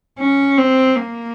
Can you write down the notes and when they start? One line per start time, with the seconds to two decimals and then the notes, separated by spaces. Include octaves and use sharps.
0.19 C#4
0.58 C4
0.96 A#3